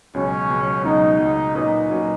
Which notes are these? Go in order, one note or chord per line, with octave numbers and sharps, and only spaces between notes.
C#2 B2 F#3 C#4
C#2 B2 F#3
C#2 B2 F#3 D#4
C#2 B2 F#3
A#2 F#3 C#4 D#4 F#4 B4
A#2 F#3 C#4 F#4 B4